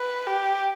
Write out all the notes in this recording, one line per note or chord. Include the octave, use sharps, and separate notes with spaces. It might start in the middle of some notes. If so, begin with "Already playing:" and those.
Already playing: B4
G4